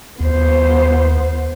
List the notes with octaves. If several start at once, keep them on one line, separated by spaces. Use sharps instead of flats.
D#2 B3 C5